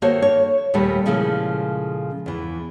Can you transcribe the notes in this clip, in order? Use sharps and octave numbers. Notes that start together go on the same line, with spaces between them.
D#3 A#3 F#4 A4 C5 C#5
C#5
D#2 A#2 G3 A3 A4 B4
A#2 C#3 F3 G#3 E4 A4
E2 E3